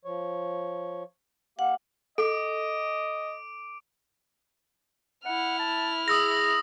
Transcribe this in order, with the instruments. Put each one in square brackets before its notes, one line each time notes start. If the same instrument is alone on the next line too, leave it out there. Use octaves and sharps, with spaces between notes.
[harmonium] F3 C#5
[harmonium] A#3 G4 F5 [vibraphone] F#5
[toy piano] A4 [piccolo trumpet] D#5 [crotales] D6 D7
[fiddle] E4 F6 [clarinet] F#5
[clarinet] A5
[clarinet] G#4 [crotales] D#6 E6 A#6